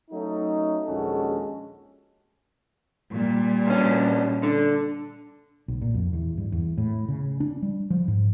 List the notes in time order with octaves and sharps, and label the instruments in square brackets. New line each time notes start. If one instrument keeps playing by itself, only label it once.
[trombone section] F#3 A3 C#4 D#4
A#1 D#2 G#3 C#4 F#4 A4
[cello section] A#2 G3
[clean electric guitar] G2 C#4
D3
[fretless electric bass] B1
A#2
F2
E2
G2
E2
A2
C#3
D4
G3
F3
G#2